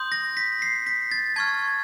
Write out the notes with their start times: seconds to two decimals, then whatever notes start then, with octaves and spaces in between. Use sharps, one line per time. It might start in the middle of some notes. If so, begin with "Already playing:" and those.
Already playing: C6 D#6 G6
0.12 A#6
0.37 B6
0.62 C7
0.86 B6
1.12 A6
1.36 A5 C#6 F6 G#6